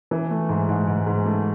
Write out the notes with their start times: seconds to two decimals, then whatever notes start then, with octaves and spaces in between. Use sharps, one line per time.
0.11 E3
0.30 A3
0.49 G#2
0.69 G#2
0.87 G#2
1.07 G#2
1.26 A3